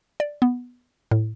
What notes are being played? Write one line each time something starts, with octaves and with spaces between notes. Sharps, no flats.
D5
B3
A2